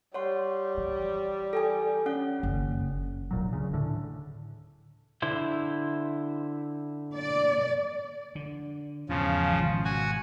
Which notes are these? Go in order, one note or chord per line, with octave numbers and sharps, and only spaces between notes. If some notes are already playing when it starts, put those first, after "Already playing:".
G3 C#5 F#5 C6
E3
A4 G5 G#5
C#4 F#5
F#1 D#3
D1 A#2 F#3
D2 C#3
A2 D3
D3 E4 C5
D5
D3
E2 G#2 C#3 F3
G#1 B2
F#4 G#5